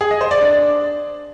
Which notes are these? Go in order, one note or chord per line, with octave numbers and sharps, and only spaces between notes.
G#4
D#5
C5
D5
D4